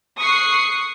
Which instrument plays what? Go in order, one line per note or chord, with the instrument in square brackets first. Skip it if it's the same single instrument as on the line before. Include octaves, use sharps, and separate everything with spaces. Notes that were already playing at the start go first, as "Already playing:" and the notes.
[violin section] C#6 D#6 F#6 C7